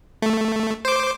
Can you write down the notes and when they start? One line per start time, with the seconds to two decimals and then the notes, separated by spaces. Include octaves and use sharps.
0.22 A3
0.85 C5 D6